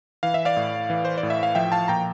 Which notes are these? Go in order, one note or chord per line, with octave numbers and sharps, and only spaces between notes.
E3 F5
E5
D5 F5
A2
E3
C5
D5
A2
E5
F5
F3 E5 G5
F5 A5
A#2 G5 A#5